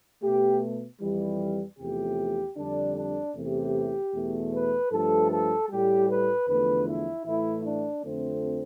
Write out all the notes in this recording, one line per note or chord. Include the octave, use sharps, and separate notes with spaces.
B2 A3 G4
F2 E3 G3
E2 C3 F3 A3 G4
F2 D3 G3 D4
D4
E2 C3 E3 A3 G4
E2 B2 A3
B4
G2 F3 A3 A4
A4
A2 G3 G4
B4
E2 D3 F3 A3 B4
E4
A2 E3 A3 E4
D4
F2 D3 F3 A3 C4